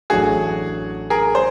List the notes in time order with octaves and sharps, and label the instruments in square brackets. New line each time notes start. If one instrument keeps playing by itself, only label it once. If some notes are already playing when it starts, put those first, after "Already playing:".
[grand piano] A1 A2 F#3 A3 D4 [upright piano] F#4 G#4
[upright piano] G#4 A#4
C5